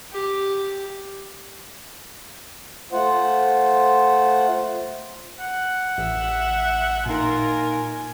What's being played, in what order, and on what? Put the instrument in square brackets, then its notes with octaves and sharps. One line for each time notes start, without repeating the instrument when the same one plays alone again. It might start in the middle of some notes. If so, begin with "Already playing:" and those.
[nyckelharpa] G4
[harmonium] A3 F4 C5 F#5
[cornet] F#5
[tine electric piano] A1 [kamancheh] E5
[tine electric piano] A#2 D#4 [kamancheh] F4 A#4 [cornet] G#5